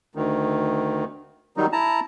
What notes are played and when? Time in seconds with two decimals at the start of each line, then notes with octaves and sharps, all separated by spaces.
0.15 D2 D#3
1.57 D#3 F#3 G3 D#4
1.72 E4 A5 A#5